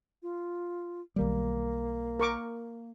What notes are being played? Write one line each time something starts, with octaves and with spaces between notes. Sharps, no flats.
F4
B1 D#3 G3 A#3
A#4 C#6 D6